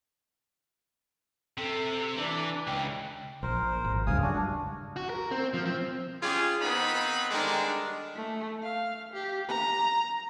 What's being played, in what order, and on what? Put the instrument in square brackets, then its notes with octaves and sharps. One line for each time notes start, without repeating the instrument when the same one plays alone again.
[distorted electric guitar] C3 [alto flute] A4
[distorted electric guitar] E3 [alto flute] D4
[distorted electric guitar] C#2 [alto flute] G5
[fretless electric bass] A#1 [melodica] A#4 C5
[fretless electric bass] G#1
[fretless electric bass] F#1 C#2 G2 [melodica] F5 G#5 D#6
[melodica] D4 F#4
[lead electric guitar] F#4
A#4
C4
F3
C4
[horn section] C#4 F4 G4 G#4
D#3 B3 C4 D#4 B4 B5
D3 D#3 G3 G#3 D4
[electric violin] A3
F5
G4
A#5